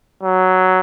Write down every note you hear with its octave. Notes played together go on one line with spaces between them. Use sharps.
F#3